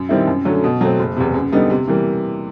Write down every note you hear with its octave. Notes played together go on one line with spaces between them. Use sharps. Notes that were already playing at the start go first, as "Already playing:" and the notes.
Already playing: F#2
D#3 G3 C4 E4
F#2
D3 F#3 A3 C#4
B2
F#3 A3 C4
F#1
E2 C3
F#2
D3 G3 B3 D#4
C3
E3 G3 A#3